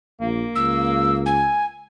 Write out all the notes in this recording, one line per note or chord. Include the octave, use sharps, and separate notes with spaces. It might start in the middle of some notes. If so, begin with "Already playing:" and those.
A#1 A#3
C#2 E6
G#5